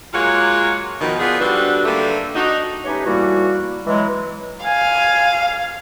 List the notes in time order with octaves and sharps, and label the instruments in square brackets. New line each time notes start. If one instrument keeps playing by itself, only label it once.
[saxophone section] F#3 G#3 A#3 F4 C#5 F#5
B2 D#3 F3
F3 B3 F4 G#4 B4 D5
D3 G3 C4 D4 F#4 B4
D3 D#3 G3 A3 A#3 G4
D4 D#4 F#4
[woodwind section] A3 C#4 D#4 G4 B4 C#5
A2 E3 G3 A#3 F#4
E3 F#3 G#3
[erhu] F5 [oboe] G#5